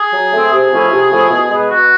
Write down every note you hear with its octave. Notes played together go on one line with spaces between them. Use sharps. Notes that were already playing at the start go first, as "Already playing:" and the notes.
Already playing: G#4
F#3
A3 C4
C3 G#4
F3 A3 C#4 E4
C3
F3 A3 C#4 E4
B2
G#3 B3
B2 F#4